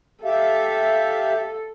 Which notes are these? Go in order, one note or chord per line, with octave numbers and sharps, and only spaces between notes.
G4 A4 E5 F5